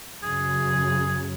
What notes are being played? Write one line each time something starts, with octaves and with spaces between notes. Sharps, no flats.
F#2 C#3 G#4